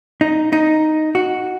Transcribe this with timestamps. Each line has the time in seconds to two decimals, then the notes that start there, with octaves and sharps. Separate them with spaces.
0.21 D#4
0.53 D#4
1.15 F#4